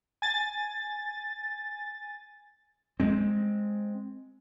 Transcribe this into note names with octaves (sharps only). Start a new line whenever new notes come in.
G#5 A6
G#3 C4